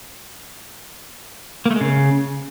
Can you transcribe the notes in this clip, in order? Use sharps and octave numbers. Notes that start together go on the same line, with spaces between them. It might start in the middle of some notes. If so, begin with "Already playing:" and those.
A#3
A3
G#3
C#3